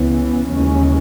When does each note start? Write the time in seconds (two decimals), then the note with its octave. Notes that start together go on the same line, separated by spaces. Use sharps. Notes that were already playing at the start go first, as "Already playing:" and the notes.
Already playing: C#2 C#3 E3 B3
0.50 D#2 C#3 E3 G#3 C#4